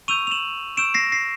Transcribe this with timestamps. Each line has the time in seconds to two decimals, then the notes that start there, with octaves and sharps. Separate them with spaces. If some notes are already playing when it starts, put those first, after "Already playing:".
0.08 C#6 E6 G6 D#7 F7
0.27 F7
0.31 E7 F#7
0.77 C#6 E6 G6 D7 E7
0.94 A#6 C7
1.12 A#6 C7